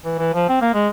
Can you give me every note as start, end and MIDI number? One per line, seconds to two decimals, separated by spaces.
0.05 0.16 52
0.19 0.32 52
0.34 0.48 53
0.49 0.60 60
0.62 0.70 58
0.74 0.88 56